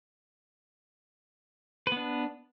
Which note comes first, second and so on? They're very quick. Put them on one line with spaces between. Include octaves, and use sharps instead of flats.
B4 B3 D4